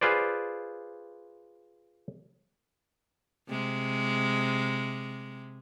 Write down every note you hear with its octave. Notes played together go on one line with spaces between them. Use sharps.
F4 G#4 B4 C5 D5
C3 G#3